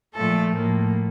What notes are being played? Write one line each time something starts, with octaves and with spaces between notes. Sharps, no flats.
A#2 F3 A3 A4
A2 F3 A#3